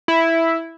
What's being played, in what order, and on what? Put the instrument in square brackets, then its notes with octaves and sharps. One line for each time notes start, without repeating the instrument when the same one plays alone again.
[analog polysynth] E4